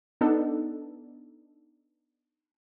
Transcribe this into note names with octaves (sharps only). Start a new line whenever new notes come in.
B3 D4 D#4 A4